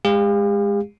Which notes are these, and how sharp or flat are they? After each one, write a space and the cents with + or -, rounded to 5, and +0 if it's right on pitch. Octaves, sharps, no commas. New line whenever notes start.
G#3 +0 G4 +45 F5 +0